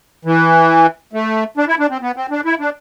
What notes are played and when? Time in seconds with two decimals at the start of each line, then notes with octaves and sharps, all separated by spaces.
0.25 E3
1.13 A3
1.57 D4
1.68 E4
1.79 D4
1.90 C4
2.01 B3
2.16 C4
2.31 D4
2.45 E4
2.60 D4